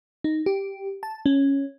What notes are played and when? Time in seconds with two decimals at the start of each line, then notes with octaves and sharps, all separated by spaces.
0.24 D#4
0.46 G4
1.03 A5
1.26 C#4